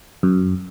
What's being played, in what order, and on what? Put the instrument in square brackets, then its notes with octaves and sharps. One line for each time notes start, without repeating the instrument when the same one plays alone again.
[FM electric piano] F#2